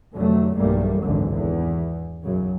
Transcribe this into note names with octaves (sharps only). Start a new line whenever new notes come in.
F1 D3 F#3 A3
B1 E2 G2 G3 A3 A#3
G#1 C#2 F#2 D3 E3
E2
B1 F#2 C#3 F#3